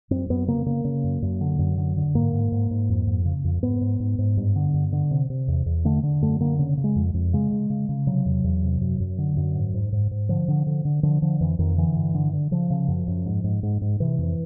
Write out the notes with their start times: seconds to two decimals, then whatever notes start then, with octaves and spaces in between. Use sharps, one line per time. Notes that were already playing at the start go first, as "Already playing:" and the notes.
0.11 F#2 C4
0.30 F#2 B3
0.48 C#3 A#3
0.66 C#3 A#3
0.85 C#3
1.04 F#2
1.22 F#2
1.41 D3
1.59 F#2
1.78 D3
1.96 D3
2.15 G#2 A#3
2.33 G#2
2.52 G#2
2.71 G#2
2.89 F2
3.07 F2
3.25 C#3
3.44 F2
3.63 G#2 B3
3.81 G#2
4.00 G#2
4.19 G#2
4.37 G2
4.56 D3
4.74 G2
4.92 D3
5.11 C3
5.30 C3
5.48 E2
5.66 E2
5.85 D3 A3
6.03 D3
6.22 F#2 A3
6.41 D3 A#3
6.59 C#3
6.77 C#3
6.84 G#3
6.96 F2
7.14 F2
7.33 C#3 G#3
7.51 C#3
7.70 C#3
7.89 C#3
8.07 C3 F#3
8.26 E2
8.44 E2
8.63 C3
8.81 F#2
9.00 F#2
9.18 D3
9.37 F#2
9.55 G#2
9.74 G#2
9.92 G#2
10.11 G#2
10.29 D3 F3
10.48 D3
10.67 D3
10.85 D3
11.03 D3 F3
11.22 D3 F3
11.40 F2 E3
11.59 F2 D#3
11.78 D3 E3
11.95 G2
12.15 D3
12.33 D3
12.51 C#3 F3
12.70 C#3
12.88 F#2
13.08 F#2
13.26 G#2
13.44 G#2
13.63 G#2
13.81 G#2
14.00 C3 E3
14.18 F2